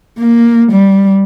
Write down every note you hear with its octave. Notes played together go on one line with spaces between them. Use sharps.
A#3
G3